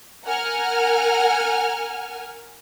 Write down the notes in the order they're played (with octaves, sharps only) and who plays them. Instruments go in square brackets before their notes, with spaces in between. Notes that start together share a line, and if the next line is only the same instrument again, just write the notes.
[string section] A#4 F#5 G#5 F6